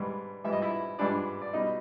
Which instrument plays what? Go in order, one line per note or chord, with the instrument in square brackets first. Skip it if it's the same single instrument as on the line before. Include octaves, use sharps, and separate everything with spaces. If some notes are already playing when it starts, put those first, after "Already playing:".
Already playing: [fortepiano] G#2 E3 G3
G#2 E3 G3 E5
D#5
E4 E5
G#2 E3 G3 D4 D5
D5
B2 G3 D#4 D#5